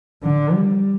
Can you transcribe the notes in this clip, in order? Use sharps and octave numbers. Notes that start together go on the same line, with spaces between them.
D3
G3